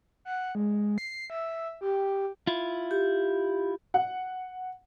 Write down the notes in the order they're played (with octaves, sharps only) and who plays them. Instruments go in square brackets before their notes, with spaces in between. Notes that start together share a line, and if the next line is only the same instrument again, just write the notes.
[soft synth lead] F#5
G#3
C7
E5
G4
[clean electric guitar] E4 F4
[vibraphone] G4
[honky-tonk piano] F#5